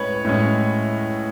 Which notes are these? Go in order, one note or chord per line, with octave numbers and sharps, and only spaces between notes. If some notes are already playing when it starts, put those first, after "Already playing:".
Already playing: A2 G#3 C#4 B4 C#5
A2 G#3 C#4